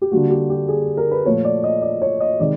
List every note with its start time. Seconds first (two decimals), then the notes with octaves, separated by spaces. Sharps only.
0.02 G4
0.12 D3 G3 A#3 F#4
0.30 G4
0.50 G4
0.68 G#4
0.97 A#4
1.11 B4
1.25 A#2 F3 A3 C#5
1.45 D5
1.64 D#5
1.82 D5
2.02 C#5
2.20 D#5
2.40 C3 D#3 G#3 D5